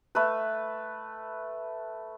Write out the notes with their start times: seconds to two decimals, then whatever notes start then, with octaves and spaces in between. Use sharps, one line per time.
0.15 A3 B4